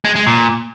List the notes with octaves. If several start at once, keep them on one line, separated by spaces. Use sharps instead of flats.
G#3
G#3
A#2